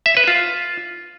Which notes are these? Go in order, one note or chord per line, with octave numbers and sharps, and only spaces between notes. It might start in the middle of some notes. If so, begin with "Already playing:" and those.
E5
B4
F4